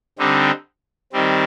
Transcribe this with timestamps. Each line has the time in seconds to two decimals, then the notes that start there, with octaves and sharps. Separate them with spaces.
0.19 D3 G3 C4 D#4
1.13 D#3 G3 C4